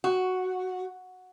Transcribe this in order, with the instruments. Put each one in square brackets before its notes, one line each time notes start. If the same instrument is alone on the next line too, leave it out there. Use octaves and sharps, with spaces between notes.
[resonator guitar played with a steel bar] F#4